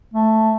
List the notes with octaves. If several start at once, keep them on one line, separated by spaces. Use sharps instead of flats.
A3